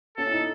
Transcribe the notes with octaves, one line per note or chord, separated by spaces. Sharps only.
C#4 A4
E4
D#4